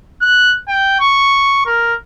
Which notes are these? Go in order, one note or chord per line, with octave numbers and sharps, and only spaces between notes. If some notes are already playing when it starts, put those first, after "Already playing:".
F#6
G5
C#6
A#4